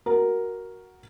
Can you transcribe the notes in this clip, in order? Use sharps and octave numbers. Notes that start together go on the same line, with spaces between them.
F#4 A#4